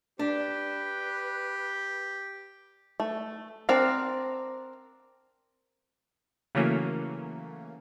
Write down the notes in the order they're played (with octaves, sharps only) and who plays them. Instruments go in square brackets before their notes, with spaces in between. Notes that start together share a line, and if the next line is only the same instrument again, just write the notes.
[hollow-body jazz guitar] D4 [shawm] G4 [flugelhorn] B4
[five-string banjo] A3
C4 D4 A#4 D5 A#5
[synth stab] C#3 E3 F#3 A3 A#3 C#4